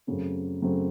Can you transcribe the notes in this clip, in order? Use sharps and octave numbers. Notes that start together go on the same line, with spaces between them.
F#2 C#3 F#3 A3 C4
F#2 C#3 F#3 A3 C4